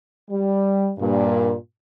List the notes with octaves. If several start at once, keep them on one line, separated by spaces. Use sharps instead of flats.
G3
G2 A#2